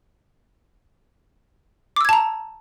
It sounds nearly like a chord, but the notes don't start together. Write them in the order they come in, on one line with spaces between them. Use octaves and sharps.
D6 E6 G#6 A5 A#5